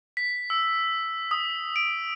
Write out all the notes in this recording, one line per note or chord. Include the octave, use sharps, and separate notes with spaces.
B6
E6
D#6
D7